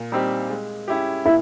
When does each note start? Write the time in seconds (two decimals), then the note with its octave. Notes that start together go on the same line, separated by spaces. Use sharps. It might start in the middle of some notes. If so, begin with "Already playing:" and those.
Already playing: A#2
0.12 G3 C4 D#4 G4
0.49 G#3
0.88 C#4 E4 G4
1.25 A#2 E4